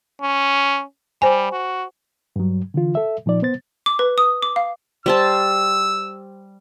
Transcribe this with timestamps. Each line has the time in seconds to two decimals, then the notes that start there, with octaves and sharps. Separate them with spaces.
0.22 C#4
1.22 G3 C5 G#5
1.52 F#4
2.36 G2 F#3
2.74 D3 E3 F4
2.95 A4 E5
3.26 A#2 F3 D#4 D5
3.42 B3 C5 A6
3.86 D6
3.99 B4
4.18 D#6
4.42 D6
4.56 F5
5.06 G3 C5 A5 E6